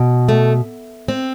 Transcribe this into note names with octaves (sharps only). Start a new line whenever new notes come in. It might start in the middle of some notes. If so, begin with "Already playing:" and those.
Already playing: B2
A3
C4